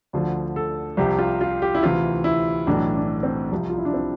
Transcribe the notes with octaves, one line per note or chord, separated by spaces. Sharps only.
D2 D3 F3
A4
C2 C3 F3 G4
F4
F4
G4
E4
D2 C3 E3 F4
E4
B1 A2 E3 D4
D4
C4
C2 C3 F3
F4
E4
D4
C4